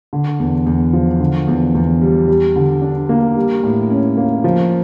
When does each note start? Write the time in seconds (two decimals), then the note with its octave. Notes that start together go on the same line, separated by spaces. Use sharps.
0.13 D3
0.39 E2
0.66 E2
0.93 F3
1.20 D3
1.47 E2
1.75 E2
2.01 G3
2.28 G3
2.56 D3
2.82 D4
3.09 A#3
3.36 G3
3.63 A2
3.90 C#4
4.17 A#3
4.44 F3